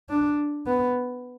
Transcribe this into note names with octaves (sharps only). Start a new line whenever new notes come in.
D4
B3